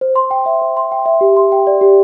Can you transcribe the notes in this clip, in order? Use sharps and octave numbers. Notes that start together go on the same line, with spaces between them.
C5
C6
G5
E5
C5
C6
G5
E5
G4
C6
G5
D5
G4